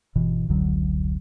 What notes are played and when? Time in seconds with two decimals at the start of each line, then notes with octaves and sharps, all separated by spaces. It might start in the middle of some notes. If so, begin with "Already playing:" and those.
0.15 G1 B2 E3
0.48 F1 C#2 D3 F#3